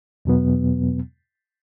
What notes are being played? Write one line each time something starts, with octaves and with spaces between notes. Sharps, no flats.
E2 B2 F#3 B3